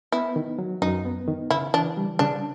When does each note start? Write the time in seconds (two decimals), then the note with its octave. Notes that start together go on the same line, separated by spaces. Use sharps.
0.12 B3 E4
0.36 D#3
0.59 F#3
0.82 F#2 D#4
1.05 B3
1.28 D#3
1.50 C#3 E4
1.74 E3 D4
1.97 G3
2.19 C#3 D4